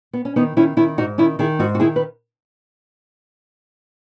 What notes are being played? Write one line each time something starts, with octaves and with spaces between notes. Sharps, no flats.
B3
C#4
D#3 B3 D#4
D#3 C#4 E4
D#3 C#4 E4
G#2 D#4 F#4
D#3 C#4 E4
D#3 E4 G#4
G#2 D#4 F#4
F#4
D#3 E4 G#4
B4